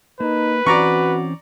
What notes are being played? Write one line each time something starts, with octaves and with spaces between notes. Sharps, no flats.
A#3 D#4 B4
E3 C4 C#4 F#4 D5 A#5 C#6